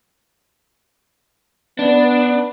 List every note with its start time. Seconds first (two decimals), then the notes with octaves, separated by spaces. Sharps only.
1.79 B3 D4